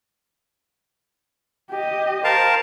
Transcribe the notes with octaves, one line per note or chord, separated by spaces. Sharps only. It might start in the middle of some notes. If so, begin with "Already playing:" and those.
G4 D#5
A#4 C5 F5 A5